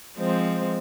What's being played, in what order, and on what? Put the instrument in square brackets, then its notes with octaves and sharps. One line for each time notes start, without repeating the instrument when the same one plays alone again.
[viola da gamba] F3 G#3 C4